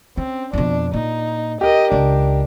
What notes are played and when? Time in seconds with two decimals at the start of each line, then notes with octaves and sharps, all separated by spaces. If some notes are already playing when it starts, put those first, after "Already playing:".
0.17 C4 C#4
0.53 F2 B2 D4
0.93 A#2 D#4
1.61 G4 A#4 D#5
1.92 C#2 D4